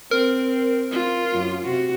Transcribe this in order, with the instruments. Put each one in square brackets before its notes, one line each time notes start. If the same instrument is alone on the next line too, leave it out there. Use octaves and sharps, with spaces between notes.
[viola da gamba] C4 [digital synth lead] A#4
[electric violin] F4
[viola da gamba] F#2
C3 F#4